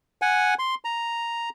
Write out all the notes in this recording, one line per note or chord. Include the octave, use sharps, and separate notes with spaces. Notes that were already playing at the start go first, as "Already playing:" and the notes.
F#5 G#5
C6
A#5